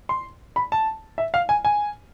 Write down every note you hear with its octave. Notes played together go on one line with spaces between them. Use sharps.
C6
B5
A5
E5
F5
G#5
G#5